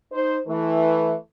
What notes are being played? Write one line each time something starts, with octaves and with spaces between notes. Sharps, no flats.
D#4 C5
E3 A3